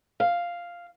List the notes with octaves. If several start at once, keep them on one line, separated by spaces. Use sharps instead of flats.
F5